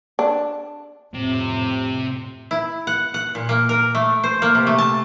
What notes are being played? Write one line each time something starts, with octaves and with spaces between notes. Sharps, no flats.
D4
F2 A2 C3
E4
F#5
F#5
A#2
A#3
A#4
A3
C5
A#3
C3
A3
A5